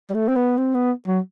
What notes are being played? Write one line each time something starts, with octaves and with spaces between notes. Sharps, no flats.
G3
A3
C4
B3
C4
B3
F#3